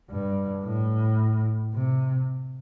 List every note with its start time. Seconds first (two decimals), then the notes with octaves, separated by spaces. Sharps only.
0.11 G2
0.65 A2
1.75 C3